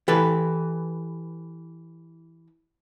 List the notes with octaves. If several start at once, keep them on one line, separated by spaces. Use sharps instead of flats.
E3 G4 A4 B4